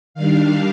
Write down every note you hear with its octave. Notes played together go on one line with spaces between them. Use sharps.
D#3 G3 D4 F5